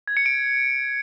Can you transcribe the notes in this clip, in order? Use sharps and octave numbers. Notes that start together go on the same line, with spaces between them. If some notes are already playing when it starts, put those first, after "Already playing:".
G#6
C#7
D7